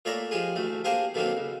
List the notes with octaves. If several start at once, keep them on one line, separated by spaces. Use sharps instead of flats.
A#2 A3 C#5 D5 E5 A#5
F3 G#3 G4 G#4
A1 D2 A3
A#3 D4 G4 G#4 A#4 C5
B2 D3 D#3 F#3 A#3 C4
C#2